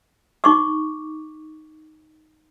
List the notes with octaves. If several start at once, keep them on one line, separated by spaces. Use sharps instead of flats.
D#4 C#6 D6